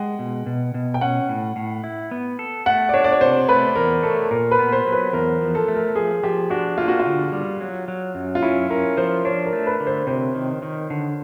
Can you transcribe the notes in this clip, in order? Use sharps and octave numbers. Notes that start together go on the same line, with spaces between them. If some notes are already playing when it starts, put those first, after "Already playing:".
Already playing: G#3 F#5 G5
B2
B2
B2
G5
C#4 F#5
A2
A2
E4
B3
A4
A3 F#5
D5
D4 C#5
D5
C#5
C3 C5
A3 B4
E2 A#4
A3 A4
A#2 A#4
B4
B3
C5
F#3
B4
E2 A#4
F3
A4
A3
A#4
F3 G#4
F3 G4
D4 F#4
A#3 F4
F#4
F4
D3
G3
F#3
F#3
F#2
F4
C#4 E4
C#4 A#4
F3 C5
D4 C#5
A#4
A3
B4
D3
C5
C3 C5
D#3
D#3
D3